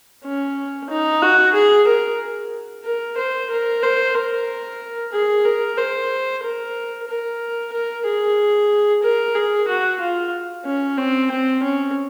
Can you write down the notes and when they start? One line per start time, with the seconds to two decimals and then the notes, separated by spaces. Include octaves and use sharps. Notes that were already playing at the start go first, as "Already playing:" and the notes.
0.24 C#4
0.90 D#4
1.23 F#4
1.54 G#4
1.87 A#4
2.85 A#4
3.17 C5
3.50 A#4
3.83 C5
4.15 A#4
5.13 G#4
5.46 A#4
5.78 C5
6.43 A#4
7.08 A#4
7.73 A#4
8.06 G#4
9.03 A#4
9.35 G#4
9.68 F#4
10.01 F4
10.65 C#4
10.98 C4
11.31 C4
11.63 C#4